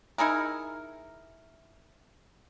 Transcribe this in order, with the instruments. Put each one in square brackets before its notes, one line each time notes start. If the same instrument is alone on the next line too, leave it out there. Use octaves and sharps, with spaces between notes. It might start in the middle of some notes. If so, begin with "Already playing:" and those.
[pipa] D#4 E4 G#4 A#4